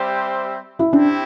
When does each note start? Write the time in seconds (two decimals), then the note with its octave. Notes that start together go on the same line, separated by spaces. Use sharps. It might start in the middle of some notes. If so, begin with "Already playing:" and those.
Already playing: G3 C4 G4 C5 E5
0.79 E4
0.93 C4 D4 E4 G4